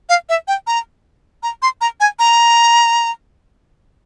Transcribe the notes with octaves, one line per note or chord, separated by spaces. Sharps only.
F5
E5
G5
A#5
A#5
C6
A#5
G#5
A#5